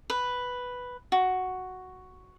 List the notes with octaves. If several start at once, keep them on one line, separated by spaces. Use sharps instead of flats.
B4
F#4